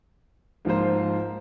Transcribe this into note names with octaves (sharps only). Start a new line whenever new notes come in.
G#2 F3 A#3 F4 C5